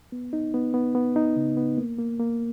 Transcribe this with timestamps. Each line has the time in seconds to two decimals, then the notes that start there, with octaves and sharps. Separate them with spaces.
0.12 B3
0.33 D#4
0.54 B3
0.74 B3
0.95 B3
1.16 D#4
1.36 C#3
1.57 B3
1.77 A#3
1.99 A#3
2.20 A#3